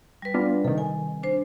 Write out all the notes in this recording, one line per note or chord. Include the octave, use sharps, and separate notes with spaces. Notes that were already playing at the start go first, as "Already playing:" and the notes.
G3 B4
B3 D4 F4
C3 D#3 A4
G#5
D4 C5